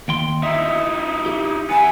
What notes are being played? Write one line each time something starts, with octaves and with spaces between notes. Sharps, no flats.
D#2 G5 C6
D#4 E4 E5
G4
B3 E5 G#5